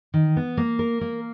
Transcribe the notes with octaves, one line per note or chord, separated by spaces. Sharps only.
D#3
B3
A#3
A#4
A#3